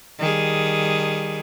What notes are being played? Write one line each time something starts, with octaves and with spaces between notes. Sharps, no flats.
D#3 G3 G#4